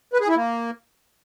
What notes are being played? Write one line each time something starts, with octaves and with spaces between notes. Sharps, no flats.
B4
G#4
E4
A#3